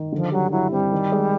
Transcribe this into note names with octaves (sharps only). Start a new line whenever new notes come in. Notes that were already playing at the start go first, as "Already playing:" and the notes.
Already playing: D#3
D3 F3
F#3 G3
F#3 E4
G3 C4
D#3
G#3